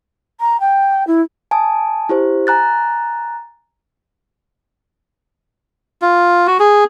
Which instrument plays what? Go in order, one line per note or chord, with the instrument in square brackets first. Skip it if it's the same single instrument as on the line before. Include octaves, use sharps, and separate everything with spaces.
[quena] A#5
G5
E4
[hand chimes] G#5 A5 D#6
E4 G4 C5
G#5 A#5 F#6 A6
[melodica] F4
F#4
G#4